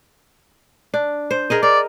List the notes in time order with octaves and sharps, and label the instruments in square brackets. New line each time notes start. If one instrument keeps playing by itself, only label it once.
[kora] D4
C5
G#4 A#4 D#5
[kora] A#4 [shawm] D5